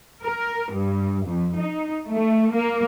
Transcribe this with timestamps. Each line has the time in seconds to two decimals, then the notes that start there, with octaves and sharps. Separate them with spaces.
0.22 A#4
0.72 G2
1.27 F2
1.57 D#4
2.08 A3
2.53 A#3